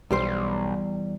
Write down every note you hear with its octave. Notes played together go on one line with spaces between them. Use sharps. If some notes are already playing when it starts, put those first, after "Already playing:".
B1 E2 G3 C5